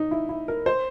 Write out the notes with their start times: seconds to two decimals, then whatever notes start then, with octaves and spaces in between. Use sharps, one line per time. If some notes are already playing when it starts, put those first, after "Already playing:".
Already playing: D#4
0.11 E4
0.29 E4
0.48 A#4
0.66 C5